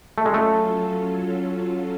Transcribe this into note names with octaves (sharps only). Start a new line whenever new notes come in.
F#3 A3 C#4 F4 A4
G#3
A3